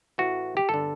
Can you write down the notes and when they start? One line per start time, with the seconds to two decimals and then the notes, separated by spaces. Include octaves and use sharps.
0.18 A1 A2 E3 F#4
0.57 G4
0.69 G1 D3 A4